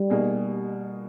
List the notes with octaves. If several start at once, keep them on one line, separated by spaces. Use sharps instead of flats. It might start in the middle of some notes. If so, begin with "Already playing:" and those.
Already playing: G3
B2 A#3 D#4 G#4